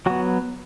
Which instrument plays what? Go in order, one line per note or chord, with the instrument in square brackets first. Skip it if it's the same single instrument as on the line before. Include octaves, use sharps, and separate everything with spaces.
[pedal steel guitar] F#3 B3 F#4